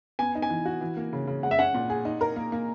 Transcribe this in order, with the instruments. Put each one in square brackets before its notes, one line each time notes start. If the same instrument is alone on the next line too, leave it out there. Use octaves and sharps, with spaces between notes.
[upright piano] B3 [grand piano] G#5
[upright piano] D#4
[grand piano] G#5
[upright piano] E3
F#4
E3
A#3
C#3
C#3
[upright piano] G#3 [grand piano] F#5
[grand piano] E5
[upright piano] C#4 [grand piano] F#5
[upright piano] A#2
G#4
D#4
A#4
A#3
A#3